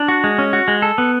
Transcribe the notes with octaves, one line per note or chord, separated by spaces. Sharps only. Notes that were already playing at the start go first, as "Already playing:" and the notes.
Already playing: D4
F#4
G#3
C#4
F#4
G#3
A4
B3